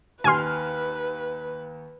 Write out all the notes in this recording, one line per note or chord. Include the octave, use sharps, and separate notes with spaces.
D#2 B4 G#5 C6 F6